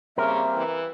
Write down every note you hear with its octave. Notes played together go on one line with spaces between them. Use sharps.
C#3 G3 A#3 C4 A#4 E5
E3